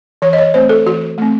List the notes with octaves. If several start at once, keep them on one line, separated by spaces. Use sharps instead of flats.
E3 C#5
D#5
C#5
A3 C4 C5
A4
E3 F#4
A3 C4